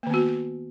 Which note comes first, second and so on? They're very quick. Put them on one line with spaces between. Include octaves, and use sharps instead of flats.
A#3 D#3 B3 F#4